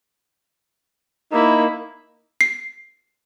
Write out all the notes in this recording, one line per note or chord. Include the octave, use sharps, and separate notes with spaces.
A#3 D#4 E4
C7